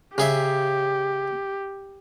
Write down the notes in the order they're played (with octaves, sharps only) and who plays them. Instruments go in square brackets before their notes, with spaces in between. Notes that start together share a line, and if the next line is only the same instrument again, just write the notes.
[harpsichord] C#3 G#4 E5 [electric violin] G4